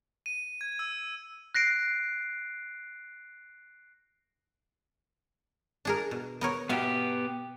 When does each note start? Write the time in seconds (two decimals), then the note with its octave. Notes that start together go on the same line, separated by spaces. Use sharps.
0.26 D#7
0.61 G#6
0.79 E6
1.55 F#6 A#6 C7 D7
5.85 D4 G#4 A#4
6.11 B2
6.41 B3 A#4 C#5
6.69 B2 B3 G4 E5 F5